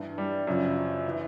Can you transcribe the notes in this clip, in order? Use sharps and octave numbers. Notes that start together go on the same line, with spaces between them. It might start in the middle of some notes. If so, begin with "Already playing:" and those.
Already playing: G2 E3
G3
F#2 C#3 F3
E3